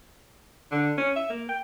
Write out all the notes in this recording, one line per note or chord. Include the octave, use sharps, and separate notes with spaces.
D3
C#4
E5
A#3
G5